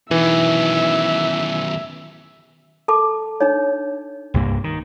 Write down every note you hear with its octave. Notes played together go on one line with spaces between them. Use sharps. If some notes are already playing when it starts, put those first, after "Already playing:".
B2 D#3 E3 E5
A4 A5 D6
D4 D#4 C#5
C2 G2 A#3
D#3